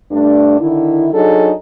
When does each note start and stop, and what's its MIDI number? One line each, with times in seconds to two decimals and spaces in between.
0.11 0.58 43
0.11 0.58 57
0.11 0.58 62
0.60 1.09 50
0.60 1.09 51
0.60 1.09 64
1.13 1.51 54
1.13 1.51 62
1.13 1.51 63
1.13 1.51 68
1.13 1.51 69